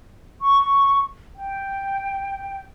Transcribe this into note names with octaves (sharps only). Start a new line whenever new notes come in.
C#6
G5